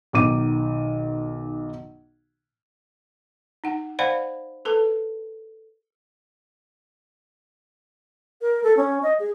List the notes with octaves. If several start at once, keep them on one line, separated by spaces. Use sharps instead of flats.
B1 D#3 D6 D#7
D#4 F#5
C5 D5 F5 F#5 G#5 B5
A4 B4 A5
A#4
A4
C#4
D#5
G#4